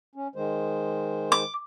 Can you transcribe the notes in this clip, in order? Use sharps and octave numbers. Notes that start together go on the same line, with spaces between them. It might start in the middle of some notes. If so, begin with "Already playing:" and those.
C#4
D#3 G#3 C5
D6